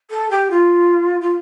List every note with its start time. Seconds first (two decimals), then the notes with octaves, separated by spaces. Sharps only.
0.10 A4
0.30 G4
0.50 F4
1.20 F4